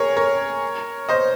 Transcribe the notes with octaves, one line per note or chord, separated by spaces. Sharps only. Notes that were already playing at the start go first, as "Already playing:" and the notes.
Already playing: G#4 A#4 C#5
A#4 C#5
C5 D#5